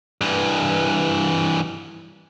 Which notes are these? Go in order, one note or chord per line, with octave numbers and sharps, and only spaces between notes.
G2 E3